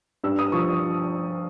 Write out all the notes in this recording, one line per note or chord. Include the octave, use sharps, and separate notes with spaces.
G2 E6
D#6
F3 C#6